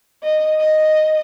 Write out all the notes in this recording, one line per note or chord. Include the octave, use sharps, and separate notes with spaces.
D#5
D#5